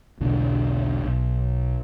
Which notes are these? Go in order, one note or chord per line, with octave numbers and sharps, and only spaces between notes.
B1 E2 B2 D3
B1